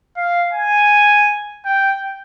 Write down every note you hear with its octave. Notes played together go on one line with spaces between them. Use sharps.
F5
G#5
G5